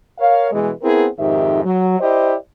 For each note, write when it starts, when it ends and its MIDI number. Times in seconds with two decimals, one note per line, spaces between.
0.19 0.50 70
0.19 0.50 73
0.19 0.50 77
0.52 0.71 47
0.52 0.71 52
0.52 0.71 56
0.83 1.06 59
0.83 1.06 60
0.83 1.06 64
0.83 1.06 68
0.83 1.06 70
1.19 1.64 41
1.19 1.64 44
1.19 1.64 51
1.19 1.64 67
1.19 1.64 76
1.64 1.98 54
1.99 2.35 64
1.99 2.35 67
1.99 2.35 72
1.99 2.35 74
1.99 2.35 75